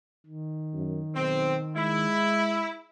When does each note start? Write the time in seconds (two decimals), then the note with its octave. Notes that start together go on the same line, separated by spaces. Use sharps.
0.26 D#3
0.74 F#2
1.16 B1 C4
1.76 G#3 E4